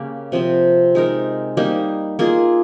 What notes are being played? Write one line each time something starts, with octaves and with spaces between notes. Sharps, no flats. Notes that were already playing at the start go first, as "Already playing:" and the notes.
Already playing: C#3 A#3 C#4 G4
C3 F3 C4
G#3 D#4 A#4
G3 A#3 D#4
A#3 F4 G#4